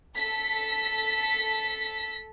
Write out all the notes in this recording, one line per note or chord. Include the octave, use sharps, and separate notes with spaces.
A4 B6